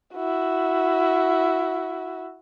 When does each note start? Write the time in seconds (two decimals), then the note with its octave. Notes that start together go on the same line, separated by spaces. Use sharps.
0.15 E4 F#4